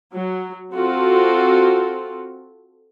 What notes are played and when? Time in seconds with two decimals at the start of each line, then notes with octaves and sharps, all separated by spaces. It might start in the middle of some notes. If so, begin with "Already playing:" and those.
0.12 F#3
0.75 C4 F4 F#4 A4